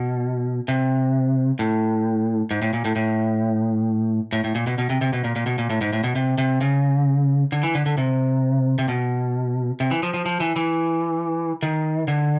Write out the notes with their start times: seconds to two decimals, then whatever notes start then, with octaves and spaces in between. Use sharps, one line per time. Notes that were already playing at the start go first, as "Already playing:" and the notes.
Already playing: B2
0.68 C3
1.59 A2
2.51 G#2
2.62 A2
2.73 A#2
2.85 A2
2.96 A2
4.33 A2
4.44 A2
4.55 A#2
4.67 B2
4.78 B2
4.90 C3
5.01 C3
5.13 B2
5.24 A#2
5.36 A#2
5.46 B2
5.58 A#2
5.70 A2
5.81 G#2
5.93 A2
6.04 B2
6.16 C3
6.38 C3
6.61 C#3
7.52 D3
7.63 E3
7.75 D3
7.86 D3
7.98 C3
8.79 C3
8.88 B2
9.80 C3
9.91 E3
10.03 F3
10.14 F3
10.26 F3
10.40 E3
10.56 E3
11.62 D#3
12.08 D3